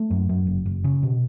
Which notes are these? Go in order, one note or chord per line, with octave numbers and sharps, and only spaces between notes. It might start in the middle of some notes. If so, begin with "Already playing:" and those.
Already playing: A3
F#2
F#2
F#1
F#1
C#3
B2